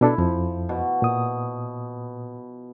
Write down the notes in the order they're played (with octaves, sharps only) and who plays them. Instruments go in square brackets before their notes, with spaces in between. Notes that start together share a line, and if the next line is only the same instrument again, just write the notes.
[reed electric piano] B2 D4 A4 [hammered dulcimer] E4
[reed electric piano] F2 [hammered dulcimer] F3
[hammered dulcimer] B2
[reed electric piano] A#2 D#6